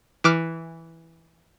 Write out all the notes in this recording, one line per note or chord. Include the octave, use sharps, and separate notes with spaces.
E3 D6 F6